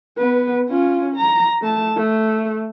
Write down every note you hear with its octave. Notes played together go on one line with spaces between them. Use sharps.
B3 B4
C#4 F4
A#5
A3 A5
A3